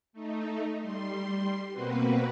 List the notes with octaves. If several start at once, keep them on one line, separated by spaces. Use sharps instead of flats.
A3 D#4
G3 C6
B2 A#3 C4 F#4 B4